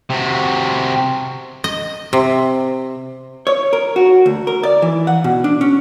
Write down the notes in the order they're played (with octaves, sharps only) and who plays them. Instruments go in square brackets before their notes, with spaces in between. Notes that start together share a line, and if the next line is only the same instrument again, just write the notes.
[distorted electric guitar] C3 F#4
[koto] D#5
C3
[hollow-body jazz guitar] C#5
A#4
F#4
D2
A#4
D5
E3
F#5
B2
D4
C#4